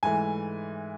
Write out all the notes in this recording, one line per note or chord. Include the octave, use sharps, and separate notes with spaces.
G#2 E3 A3 G#5